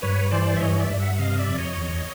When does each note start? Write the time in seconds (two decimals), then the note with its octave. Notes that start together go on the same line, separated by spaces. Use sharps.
0.02 G2 B4 C#5
0.31 E3 C5 D5
0.57 E5
0.60 G2 C#5 D#5
0.76 D#5
0.80 D5 E5
0.90 G2
0.99 E5 F#5
1.15 E5
1.19 C3 D#5 F5
1.38 D5 E5
1.48 F2
1.58 C#5 D#5
1.77 E2